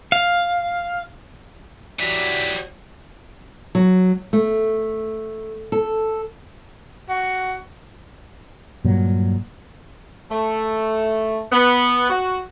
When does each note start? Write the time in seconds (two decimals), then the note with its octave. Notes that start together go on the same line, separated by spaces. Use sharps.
0.12 F5
1.99 E3 F#3 F#4 G4 D5 B6
3.75 F#3
4.33 A3
5.72 A4
7.09 F#4
8.85 G2 A#2 F#3
10.31 A3
11.52 B3
12.10 F#4